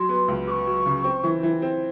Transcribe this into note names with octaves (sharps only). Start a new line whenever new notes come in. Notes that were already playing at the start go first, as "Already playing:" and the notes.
Already playing: F#3 C6
B3
C#2
B3 C#6 D6
F#3
C#3
C4
E3
E3
C4